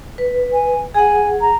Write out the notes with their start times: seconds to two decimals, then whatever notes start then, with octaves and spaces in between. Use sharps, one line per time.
0.18 B4
0.53 G#5
0.95 G#4 F#5 G#5
1.40 A#5